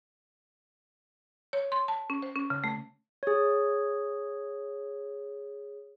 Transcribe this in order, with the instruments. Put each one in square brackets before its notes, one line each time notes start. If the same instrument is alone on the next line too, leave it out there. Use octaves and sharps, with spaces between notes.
[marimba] C#5
C6
A5
C#4
C5
C#4
C#3
A3
[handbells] G#4 C#5